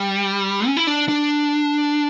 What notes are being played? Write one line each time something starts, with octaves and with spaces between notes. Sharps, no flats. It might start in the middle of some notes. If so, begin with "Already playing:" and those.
Already playing: G3
C#4
E4
D4
D4